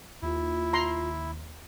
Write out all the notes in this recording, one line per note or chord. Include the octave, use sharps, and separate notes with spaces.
D#2 E4 F4
A#5 C6